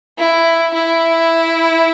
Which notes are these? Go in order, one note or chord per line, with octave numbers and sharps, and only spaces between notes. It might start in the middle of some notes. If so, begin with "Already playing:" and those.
E4
E4